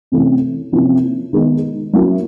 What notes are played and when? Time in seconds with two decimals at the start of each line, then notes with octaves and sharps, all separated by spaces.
0.12 C3 E3 A3 C#4
0.72 C3 F3 A#3 C#4 E4
1.33 D#3 G#3 B3 D#4
1.93 F#3 A#3 C#4 E4